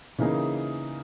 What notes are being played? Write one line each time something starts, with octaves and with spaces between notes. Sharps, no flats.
C#3 E3 A#3 D#4 G#4